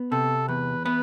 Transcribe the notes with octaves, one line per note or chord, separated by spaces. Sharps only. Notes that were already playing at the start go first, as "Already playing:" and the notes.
Already playing: B3
C3 A4
E2 B4
B3 B4